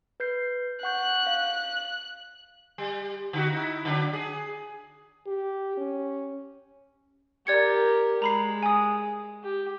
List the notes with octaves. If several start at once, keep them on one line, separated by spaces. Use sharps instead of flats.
B4 G6 C7
F#5 C#6 F#6 G6
F5
G3
D3 D#4 F#4
D#4 E4
D3 F#3 D4
G#4
G4
C#4
G4 A#4 D5 G#6 C#7
G#3 A#5 B5 C7
G#5 D#6
G4